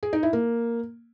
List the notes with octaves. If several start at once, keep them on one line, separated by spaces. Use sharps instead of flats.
G#4
D#4
E4
A#3